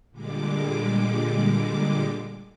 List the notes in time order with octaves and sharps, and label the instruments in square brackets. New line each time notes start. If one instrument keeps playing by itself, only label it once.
[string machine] A#2 D3 G3 G#3 D6